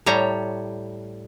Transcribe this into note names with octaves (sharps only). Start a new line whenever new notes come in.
A2 G3 C#5 A#5